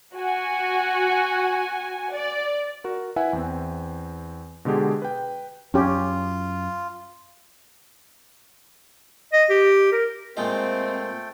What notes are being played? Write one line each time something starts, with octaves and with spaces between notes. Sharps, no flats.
F#4 G#5
D5
F#4 A#4
E4 B4 E5 F#5 G#5 B5
E2 C4
B2 D3 G#3 G4 G#4
B4 G5
F#2 C#4 F4 G4
D#5
G4
A#4
A#2 G#3 A3 C4 F4 A4 D#5 G5